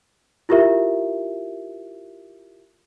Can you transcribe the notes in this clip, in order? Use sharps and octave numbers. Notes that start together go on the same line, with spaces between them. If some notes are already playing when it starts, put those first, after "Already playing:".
E4 F4 G4 A#4 E5